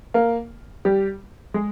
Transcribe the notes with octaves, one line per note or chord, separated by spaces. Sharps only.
A#3 A#4
G3 G4
G#3 G#4